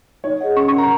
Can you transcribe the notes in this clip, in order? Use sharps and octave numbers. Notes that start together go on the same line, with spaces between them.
D#4 C#5
G#4 D#5 F#5
C#4 C#6
C#6
A#4 F#5 A#5